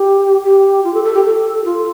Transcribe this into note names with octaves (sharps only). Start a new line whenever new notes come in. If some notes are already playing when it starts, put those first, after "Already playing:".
Already playing: G4
G4
F4
A4
A4
G4
A4
F4